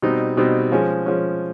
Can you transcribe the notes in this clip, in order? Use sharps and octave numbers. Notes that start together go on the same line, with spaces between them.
B2 G3 C4 D#4
B2 G3 C4 D#4
F3 G#3 C#4
F3 G#3 C#4